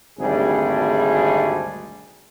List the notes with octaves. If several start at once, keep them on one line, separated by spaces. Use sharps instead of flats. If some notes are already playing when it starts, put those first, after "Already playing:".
G#1 D2 C3 G3 D4 G#4